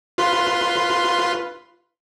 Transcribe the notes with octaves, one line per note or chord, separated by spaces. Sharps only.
F4 B4 C6